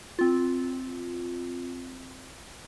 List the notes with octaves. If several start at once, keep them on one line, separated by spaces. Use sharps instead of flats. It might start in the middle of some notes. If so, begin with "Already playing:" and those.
C4 F4